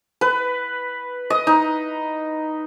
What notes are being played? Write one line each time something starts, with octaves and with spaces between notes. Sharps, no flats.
B4
D#5
D#4